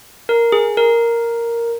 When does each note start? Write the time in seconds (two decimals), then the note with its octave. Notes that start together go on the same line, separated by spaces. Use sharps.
0.29 A#4
0.52 G#4
0.77 A#4